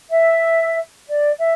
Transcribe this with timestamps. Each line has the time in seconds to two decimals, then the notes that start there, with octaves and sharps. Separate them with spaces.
0.11 E5
1.08 D5
1.39 E5